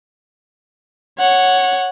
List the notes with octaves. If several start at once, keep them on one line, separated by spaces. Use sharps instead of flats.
C#5 F#5